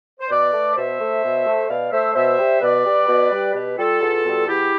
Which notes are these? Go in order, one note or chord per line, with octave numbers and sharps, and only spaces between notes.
C5
B2 B4 D5
A3
B2 C5 E5
A3
B2
A3
B2 D5 F5
A3 C5 E5
B2 C5 E5
G3
B2 B4 D5
G3
B2
G3
B2 G4 B4
G3 F4 A4
E2
B2 G3
E2 E4 G4